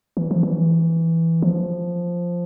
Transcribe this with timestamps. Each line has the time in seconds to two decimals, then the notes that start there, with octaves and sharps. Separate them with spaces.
0.17 E3
0.31 F3
0.43 E3
1.42 F3